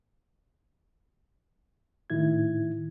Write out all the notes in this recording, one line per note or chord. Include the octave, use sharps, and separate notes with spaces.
A2 D#3 E4 G#6